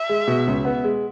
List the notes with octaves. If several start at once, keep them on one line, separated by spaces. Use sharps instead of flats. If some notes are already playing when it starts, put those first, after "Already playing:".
Already playing: E5
G#3
B2
C#2
B3
G#3